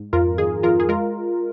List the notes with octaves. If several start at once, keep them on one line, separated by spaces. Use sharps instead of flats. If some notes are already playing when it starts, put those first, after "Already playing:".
Already playing: G#2
F2 F4 A#4
D#3 G#4
F2 F4 A#4
G#4
G#3 F4 A#4